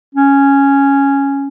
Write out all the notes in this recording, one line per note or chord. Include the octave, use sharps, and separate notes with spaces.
C#4